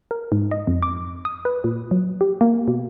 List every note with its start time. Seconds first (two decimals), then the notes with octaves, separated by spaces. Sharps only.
0.11 A#4
0.32 G#2
0.51 D#5
0.67 F2
0.83 D6
1.25 D#6
1.45 B4
1.64 A#2
1.91 F#3
2.21 G4
2.41 A#3
2.68 B2